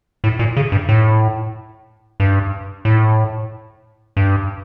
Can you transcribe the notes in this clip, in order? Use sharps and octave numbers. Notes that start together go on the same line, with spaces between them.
A2
A#2
C#3
G2
A2
G2
A2
G2